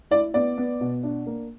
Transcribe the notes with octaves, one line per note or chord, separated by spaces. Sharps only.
E4 D5
B3 D5
B3
B2
D4
A#3